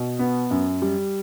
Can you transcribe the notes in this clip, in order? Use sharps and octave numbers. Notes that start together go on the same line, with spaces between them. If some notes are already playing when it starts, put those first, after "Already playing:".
Already playing: B2
B3
F#2
G3